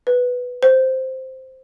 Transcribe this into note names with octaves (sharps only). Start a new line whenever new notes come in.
B4
C5